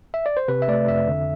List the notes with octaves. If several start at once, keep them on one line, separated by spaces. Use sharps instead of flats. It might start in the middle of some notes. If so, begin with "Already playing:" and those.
E5
D5
C5
C3 B4
E5
A3 D5
F2 E5
D3